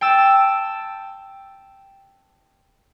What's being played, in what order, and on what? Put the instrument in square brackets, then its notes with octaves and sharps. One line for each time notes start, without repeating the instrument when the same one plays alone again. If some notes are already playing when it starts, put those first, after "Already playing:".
[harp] G5 A5 E6 E7